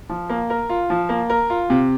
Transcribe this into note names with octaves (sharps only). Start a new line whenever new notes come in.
F3
A#3
A#4
F4
F3
A#3
A#4
F4
C3